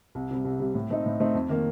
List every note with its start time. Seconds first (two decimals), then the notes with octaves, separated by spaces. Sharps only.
0.15 C2
0.31 C3 G3
0.45 C2
0.60 C3 G3
0.75 A2
0.90 A3 C4 D#4
1.06 A2
1.20 A3 C4 D#4
1.35 F2
1.49 D#3 A#3